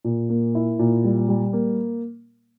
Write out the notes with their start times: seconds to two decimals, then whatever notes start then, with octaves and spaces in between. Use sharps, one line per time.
0.04 A#2
0.29 A#3
0.55 E4
0.79 A#2
1.04 G3
1.28 G3
1.53 A#3